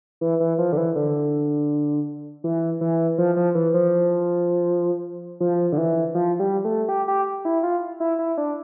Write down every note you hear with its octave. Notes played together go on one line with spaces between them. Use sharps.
E3
E3
F3
D3
E3
D3
E3
E3
F3
F3
E3
F3
F3
D3
E3
F3
G3
A3
G4
G4
E4
F4
E4
E4
D4